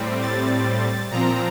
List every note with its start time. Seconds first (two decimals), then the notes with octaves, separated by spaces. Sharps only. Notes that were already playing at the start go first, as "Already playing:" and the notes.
Already playing: A2 G3 C4
0.21 A6
1.11 A#2 F3 C4 A#5